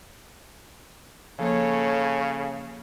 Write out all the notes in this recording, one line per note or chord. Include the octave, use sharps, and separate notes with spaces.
C#3 F3 A#3 A4 C#5